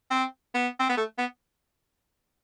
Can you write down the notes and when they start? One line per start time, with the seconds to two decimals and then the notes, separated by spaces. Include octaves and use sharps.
0.11 C4
0.54 B3
0.80 C4
0.89 B3
0.97 A3
1.18 B3